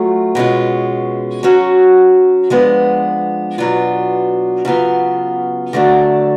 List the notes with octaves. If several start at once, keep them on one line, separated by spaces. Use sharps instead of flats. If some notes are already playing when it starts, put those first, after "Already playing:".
Already playing: F#3 A3 F4
B2 G#3 C#4 F4
F#3 C#4 F#4
F3 G#3 B3 D4
B2 F#3 B3 D4 F4
C#3 F#3 B3 F4
D3 F#3 A3 D4